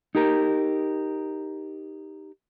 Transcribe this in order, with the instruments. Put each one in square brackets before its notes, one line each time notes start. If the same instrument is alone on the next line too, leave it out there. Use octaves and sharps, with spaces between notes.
[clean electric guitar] D#4 G4 A#4